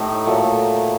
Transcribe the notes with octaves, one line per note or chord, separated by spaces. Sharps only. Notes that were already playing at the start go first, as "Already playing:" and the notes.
Already playing: A2 A3 D#4 G4
A#2 F#3 A3